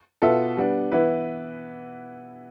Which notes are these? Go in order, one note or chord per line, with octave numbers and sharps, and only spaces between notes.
B2 B3 F4 A4 E5
G3 B3 D4
E3 B3 E4 B4